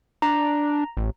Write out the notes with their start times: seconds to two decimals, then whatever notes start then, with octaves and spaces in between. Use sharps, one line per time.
0.22 D4 A#5
0.97 A1